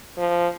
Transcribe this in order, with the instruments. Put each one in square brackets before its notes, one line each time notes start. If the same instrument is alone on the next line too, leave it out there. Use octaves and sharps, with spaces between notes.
[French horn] F3